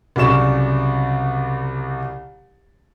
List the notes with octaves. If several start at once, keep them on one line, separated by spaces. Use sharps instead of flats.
C2 C#3 F#3 D5 C#6 E7